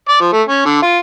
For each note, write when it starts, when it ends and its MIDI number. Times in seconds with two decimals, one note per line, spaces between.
0.09 0.20 74
0.21 0.30 53
0.33 0.42 57
0.48 0.65 61
0.66 0.80 50
0.83 0.98 65